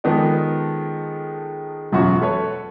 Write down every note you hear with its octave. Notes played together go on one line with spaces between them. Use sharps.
D#3 F3 G#3 B3 A4 D5
E1 F#2 C#4 F4 F#4 C#6
A4 B4 C#5